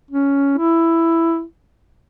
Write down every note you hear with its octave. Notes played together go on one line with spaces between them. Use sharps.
C#4
E4